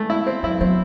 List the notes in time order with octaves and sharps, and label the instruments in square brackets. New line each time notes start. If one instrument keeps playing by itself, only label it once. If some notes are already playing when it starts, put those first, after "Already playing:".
Already playing: [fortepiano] E3 A3 [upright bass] G#3
[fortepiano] E4
C4
[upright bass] F#3 [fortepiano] E4
[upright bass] F#3 [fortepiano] C4